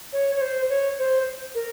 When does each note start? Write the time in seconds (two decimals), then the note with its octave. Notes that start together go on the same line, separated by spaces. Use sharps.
0.13 C#5
0.35 C#5
0.41 C5
0.69 C#5
0.99 C5
1.55 A#4